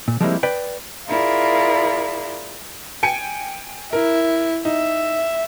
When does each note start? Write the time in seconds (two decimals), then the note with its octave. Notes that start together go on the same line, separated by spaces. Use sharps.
0.08 A#2
0.20 F3 G3 G#3 A#3 C4 E4
0.43 B4 D5 G5
1.09 E4 F4 G#4 A#4 D5
3.03 G5 G#5 C#7
3.93 E4 A#4
4.65 D#4 E5